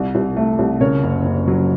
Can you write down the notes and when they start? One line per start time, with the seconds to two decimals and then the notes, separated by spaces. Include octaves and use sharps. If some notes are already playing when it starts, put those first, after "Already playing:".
Already playing: C2
0.15 C2
0.37 A3
0.59 C2
0.80 C#3 A#4 C#5
1.03 F#1
1.25 F#1
1.48 F#3